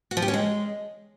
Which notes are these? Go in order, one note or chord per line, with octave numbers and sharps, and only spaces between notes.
F#4
F3
G4
C#4
G#3